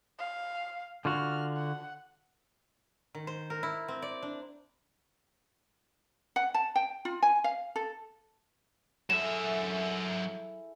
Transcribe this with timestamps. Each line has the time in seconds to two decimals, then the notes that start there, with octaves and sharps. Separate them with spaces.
0.19 F5
1.05 D3 F4 F#4 F6
1.57 F#5
3.15 D#3
3.27 C5
3.50 A#4
3.63 E4
3.88 C4
4.02 D5
4.22 D4
6.36 F#5
6.54 A5
6.76 G5
7.05 F4
7.22 G#5
7.44 F5
7.76 A4
9.10 F#3 E4 G#4 A4 E5 E7